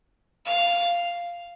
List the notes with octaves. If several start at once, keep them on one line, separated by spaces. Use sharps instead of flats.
F5